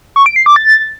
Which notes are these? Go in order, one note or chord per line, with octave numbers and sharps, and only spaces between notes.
C#6
D7
C7
D6
A6